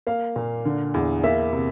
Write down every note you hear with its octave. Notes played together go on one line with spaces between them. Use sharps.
A#3 F5
A#2
D3
E2
A#3 E5
C3